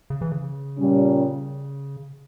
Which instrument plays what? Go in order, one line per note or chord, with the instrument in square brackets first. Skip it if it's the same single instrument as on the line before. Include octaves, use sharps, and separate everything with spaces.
[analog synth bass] C#3
E3
C#3
[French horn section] A#2 G3 C#4